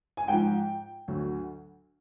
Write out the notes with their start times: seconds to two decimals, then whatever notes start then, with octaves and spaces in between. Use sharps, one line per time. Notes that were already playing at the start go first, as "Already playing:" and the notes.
0.17 G#5
0.28 G#2 F3 G5
1.08 D2 D3 F#3